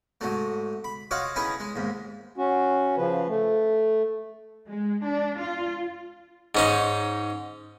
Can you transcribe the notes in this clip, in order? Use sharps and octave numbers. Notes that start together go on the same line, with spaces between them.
G#2 F#3 A3
B5
F4 F#4 C#5 D#5 F5 F#5
C#4 D#4 E4 G#4 B4 C#5
G#3
D#2 G#2
C#4 F#4
C#3 F3 B4
A3
G#3
D4
F4
G#2 C#4 D#4